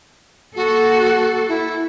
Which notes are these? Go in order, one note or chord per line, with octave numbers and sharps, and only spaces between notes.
A#3 F#4 A4
E4